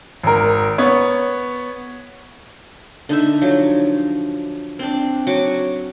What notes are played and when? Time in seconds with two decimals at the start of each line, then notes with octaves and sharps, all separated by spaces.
0.23 G#1 A#4
0.78 B3 C#5
3.09 D3 D#4 E5
3.41 F3 F#3
4.79 C4 D4
5.27 F#3 F#4 D6